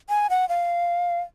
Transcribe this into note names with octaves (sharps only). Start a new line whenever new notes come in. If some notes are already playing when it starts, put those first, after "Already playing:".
G#5
F#5
F5